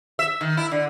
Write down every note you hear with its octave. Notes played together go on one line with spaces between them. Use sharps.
E5
D#3
E4
D3